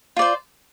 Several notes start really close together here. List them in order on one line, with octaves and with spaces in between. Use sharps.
F4 D5 C5